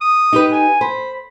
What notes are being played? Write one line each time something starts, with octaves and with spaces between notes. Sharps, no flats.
D#6
D#4 G4 B4
G#5
C5 B5